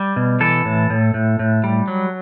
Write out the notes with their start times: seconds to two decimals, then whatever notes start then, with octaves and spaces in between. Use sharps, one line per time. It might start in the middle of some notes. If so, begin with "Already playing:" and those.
Already playing: G3
0.16 B2
0.40 E3 A4
0.65 A2
0.90 A2
1.14 A2
1.39 A2
1.64 G3
1.88 F#3